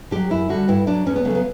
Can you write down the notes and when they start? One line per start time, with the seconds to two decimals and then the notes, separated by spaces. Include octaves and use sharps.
0.11 D3 F#3 G4
0.30 F#2 E4
0.49 D3 G3 F#4
0.68 G2 E4
0.87 F#3 D4
1.06 E2 C#4
1.16 B3
1.25 C#3 A3
1.30 F#3 B3